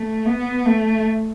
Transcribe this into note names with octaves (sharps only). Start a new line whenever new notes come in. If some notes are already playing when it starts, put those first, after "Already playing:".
Already playing: A3
B3
A3